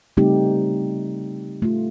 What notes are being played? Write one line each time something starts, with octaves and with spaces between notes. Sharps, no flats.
C#3 G3 A3 C4 D#4 G4
A3 F4